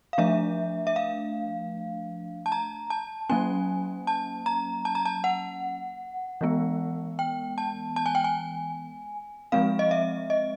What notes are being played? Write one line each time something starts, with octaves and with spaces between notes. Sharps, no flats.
F5
F3 A3 D4 E5
E5
F5
A5
A#5
A5
F#3 A#3 C#4 G#5
A5
A#5
A5
A#5
A5
F#5
E3 G#3 B3
G5
A5
A5
G#5
G5
G#5
F3 G#3 C4 F5
D#5
E5
D#5